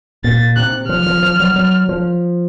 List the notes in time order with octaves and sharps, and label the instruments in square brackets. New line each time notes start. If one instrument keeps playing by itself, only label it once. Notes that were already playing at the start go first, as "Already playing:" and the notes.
[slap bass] A#2 [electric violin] A6
[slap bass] C3 [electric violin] F#6
[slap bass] F3 [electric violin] F6
[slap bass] F3
F3
F#3
F#3
F3